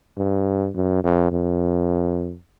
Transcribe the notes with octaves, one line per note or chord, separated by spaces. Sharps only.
G2
F#2
F2
F2